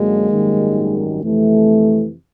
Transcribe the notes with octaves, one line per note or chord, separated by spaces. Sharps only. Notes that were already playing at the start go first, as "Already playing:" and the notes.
Already playing: F#2 D3 F#3 G#3 A#3
G#1 F#2 D#3 G3
F2 C3 E3 A3